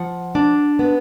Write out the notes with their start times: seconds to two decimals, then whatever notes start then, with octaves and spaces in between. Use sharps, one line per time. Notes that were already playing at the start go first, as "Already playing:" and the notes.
Already playing: F3 F#5
0.35 D4
0.79 B3